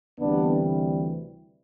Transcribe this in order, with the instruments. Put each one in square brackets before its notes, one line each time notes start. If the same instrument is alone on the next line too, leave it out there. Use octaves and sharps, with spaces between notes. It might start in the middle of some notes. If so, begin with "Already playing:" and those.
[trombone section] D2 C3 E3 G3 B3 D4